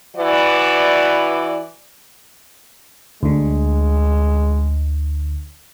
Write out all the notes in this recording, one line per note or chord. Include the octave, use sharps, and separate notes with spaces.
E3 F#4 B4 D5
D2 D3 G#3